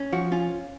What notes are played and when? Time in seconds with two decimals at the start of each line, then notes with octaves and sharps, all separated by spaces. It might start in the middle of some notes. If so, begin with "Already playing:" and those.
Already playing: C#4
0.13 F3 F#4
0.31 C#4 F4